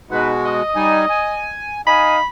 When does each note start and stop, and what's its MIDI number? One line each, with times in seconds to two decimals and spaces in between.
0.10 0.62 47
0.10 0.62 56
0.10 0.32 63
0.10 0.62 66
0.10 0.32 71
0.46 1.56 75
0.46 1.32 87
0.76 1.06 55
0.76 1.06 63
0.76 1.06 80
1.10 1.81 80
1.87 2.19 63
1.87 2.19 75
1.87 2.19 77
1.87 2.16 80
1.87 2.26 83